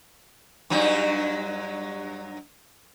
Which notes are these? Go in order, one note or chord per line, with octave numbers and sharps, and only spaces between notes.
G2 F#3 D#4